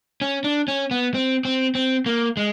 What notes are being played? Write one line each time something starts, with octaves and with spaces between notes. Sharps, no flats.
C#4
D4
C#4
B3
C4
C4
C4
A#3
G#3